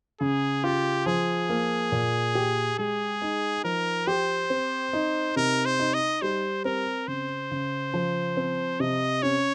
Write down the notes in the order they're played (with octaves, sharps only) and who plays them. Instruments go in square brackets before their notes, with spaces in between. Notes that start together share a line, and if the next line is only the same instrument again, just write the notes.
[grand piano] C#3 [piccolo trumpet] G#4
[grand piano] F4 [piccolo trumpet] G4
[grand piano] F3 [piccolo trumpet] G#4
[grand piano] A#3
A#2
G4
[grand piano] G#3 [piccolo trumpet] G#4
[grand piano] D#4
[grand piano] F3 [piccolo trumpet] A#4
[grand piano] G4 [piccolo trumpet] C5
[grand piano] C4
D#4
[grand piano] C3 [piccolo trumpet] A#4
[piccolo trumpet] C5
[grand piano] D#4
[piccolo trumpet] D#5
[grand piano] G3 [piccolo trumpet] C5
[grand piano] C4 [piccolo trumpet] A#4
[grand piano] C#3 [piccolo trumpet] C5
[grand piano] C#3
F3
C4
[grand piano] C3 [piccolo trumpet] D#5
[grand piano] C#4 [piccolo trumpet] C#5